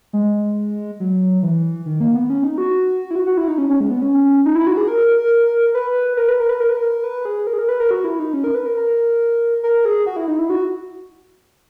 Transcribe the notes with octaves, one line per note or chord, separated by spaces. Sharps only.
G#3
F#3
E3
D#3
A#3
B3
C#4
D#4
F#4
E4
F#4
F#4
E4
D#4
C#4
C#4
G#3
B3
C#4
D#4
E4
F#4
G#4
A#4
B4
A#4
B4
A#4
B4
A#4
B4
A#4
B4
G#4
A#4
G#4
A#4
B4
A#4
F#4
E4
D#4
C#4
A#4
B4
A#4
A#4
A#4
G#4
F#4
E4
D#4
E4
F#4